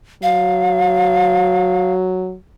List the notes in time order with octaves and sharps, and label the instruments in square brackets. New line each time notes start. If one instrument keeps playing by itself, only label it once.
[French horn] F#3 [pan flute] F5